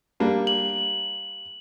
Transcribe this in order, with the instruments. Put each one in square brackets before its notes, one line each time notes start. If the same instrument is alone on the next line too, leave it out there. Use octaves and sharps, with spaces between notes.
[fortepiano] G3 A#3 D4
[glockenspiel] F#7